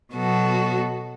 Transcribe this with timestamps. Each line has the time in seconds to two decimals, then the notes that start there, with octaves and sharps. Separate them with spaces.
0.14 B2 F#3 B3 F#4 A4